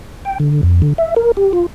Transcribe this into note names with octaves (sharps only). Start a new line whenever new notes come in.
G5
D3
F2
D3
E5
A#4
G4
F4